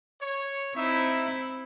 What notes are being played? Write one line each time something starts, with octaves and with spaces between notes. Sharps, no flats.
C#5
C4 D#4 E4 E5